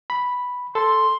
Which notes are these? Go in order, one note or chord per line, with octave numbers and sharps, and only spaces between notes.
B5
A4 C6